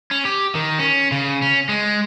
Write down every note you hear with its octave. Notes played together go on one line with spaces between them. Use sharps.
C#4
G4
D#3
C#4
C#3
C#4
G#3